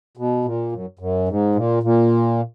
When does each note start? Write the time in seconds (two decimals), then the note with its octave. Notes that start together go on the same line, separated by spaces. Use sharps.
0.17 B2
0.45 A#2
0.72 F#2
0.99 F#2
1.28 G#2
1.55 A#2
1.83 A#2